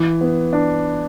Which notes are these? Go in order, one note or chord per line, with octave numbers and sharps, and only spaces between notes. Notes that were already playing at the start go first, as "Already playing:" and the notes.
Already playing: E3
B3
D4